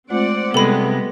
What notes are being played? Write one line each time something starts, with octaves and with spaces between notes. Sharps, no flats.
G#3 A3 C4 F4 D5 F#5
C3 G3 G#3 B3 A4 B5